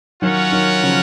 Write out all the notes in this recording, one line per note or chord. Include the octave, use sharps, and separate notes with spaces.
D#3 F#3 C#4 F4 A#4 C#5 F#5
D#3 F#3
C#3 F3